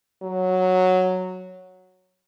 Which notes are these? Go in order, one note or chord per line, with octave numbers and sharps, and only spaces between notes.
F#3